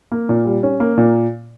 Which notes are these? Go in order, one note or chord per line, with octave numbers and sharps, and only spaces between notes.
A#3
A#2
G3
C#4
A#3
A#2